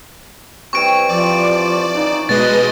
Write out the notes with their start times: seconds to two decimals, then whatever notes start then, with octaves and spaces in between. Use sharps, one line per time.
0.73 C3 E3 G3 C#6 D7
1.09 F3 D5
1.95 C#3 D#4
2.29 B2 G#3 B4 D#5 A6